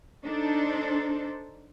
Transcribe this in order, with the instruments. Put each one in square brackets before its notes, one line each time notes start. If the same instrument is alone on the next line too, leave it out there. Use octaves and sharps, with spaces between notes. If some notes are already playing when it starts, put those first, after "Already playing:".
[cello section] D4 D#4 A4 C5